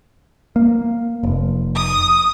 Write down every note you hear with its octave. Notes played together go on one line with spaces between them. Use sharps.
A#3
F1
D#6